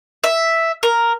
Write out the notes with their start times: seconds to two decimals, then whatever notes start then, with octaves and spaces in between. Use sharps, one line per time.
0.24 E5
0.83 A#4